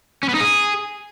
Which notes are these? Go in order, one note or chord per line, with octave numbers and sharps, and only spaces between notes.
C#4
B3
D#4
G#4